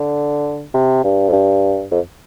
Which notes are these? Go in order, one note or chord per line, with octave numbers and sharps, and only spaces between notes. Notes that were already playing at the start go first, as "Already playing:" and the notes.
Already playing: D3
C3
G2
F2
G2
F2